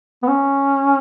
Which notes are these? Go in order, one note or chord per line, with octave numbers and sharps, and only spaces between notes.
B3
C#4